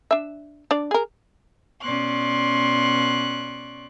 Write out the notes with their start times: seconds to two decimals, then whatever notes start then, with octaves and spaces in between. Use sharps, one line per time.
0.11 D4 E5
0.71 D4 D5
0.91 G#4 A#4
1.82 B2 C#4 D5 C6 C#6 F#6